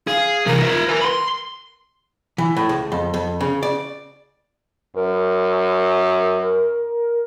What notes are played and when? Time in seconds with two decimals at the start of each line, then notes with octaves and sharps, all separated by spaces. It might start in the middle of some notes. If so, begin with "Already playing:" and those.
0.07 G#4 F5
0.46 C3 E3 A#4
0.62 F4 E5
0.88 B4 G#5
1.01 B5 C6
2.38 E3
2.57 A2
2.69 C#2
2.92 F2
3.14 F2
3.41 C#3
3.63 D5
4.96 F#2 A#4